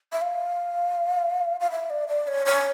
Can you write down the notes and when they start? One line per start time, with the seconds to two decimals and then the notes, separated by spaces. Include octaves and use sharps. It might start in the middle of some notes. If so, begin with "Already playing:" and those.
0.12 E5
0.21 F5
1.60 F5
1.71 E5
1.90 D5
2.08 D5
2.28 C#5
2.46 C#5